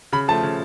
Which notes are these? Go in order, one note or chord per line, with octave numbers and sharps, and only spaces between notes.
C#3 B5
F3 A3 A5
C#3